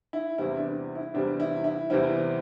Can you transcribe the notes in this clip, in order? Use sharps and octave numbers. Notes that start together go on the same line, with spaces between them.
E4
E2 C3 E3 G3 C4 E4
D4
E4
E2 C3 E3 G3 C4 D4
E4
E4
E2 C3 E3 G3 C4 E4